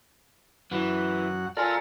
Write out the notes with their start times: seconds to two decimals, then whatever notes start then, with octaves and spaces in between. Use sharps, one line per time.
0.71 F#2 E3 F#5
1.57 F4 A4 A#4 D5 G#5